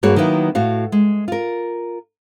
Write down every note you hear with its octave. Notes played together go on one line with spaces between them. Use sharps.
G2 A#3 F#4 G#4 C#5
D#3 F#3 A#3 B3 E4
A2 F#4 F5
G#3
F4 A#4